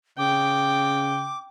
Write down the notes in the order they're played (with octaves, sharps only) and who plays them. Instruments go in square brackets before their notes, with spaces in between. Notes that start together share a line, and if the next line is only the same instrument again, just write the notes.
[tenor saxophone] C#3 [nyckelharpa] G5 [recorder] D6